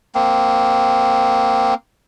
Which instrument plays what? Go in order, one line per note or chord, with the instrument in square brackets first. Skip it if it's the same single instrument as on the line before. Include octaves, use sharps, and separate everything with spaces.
[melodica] A#3 C4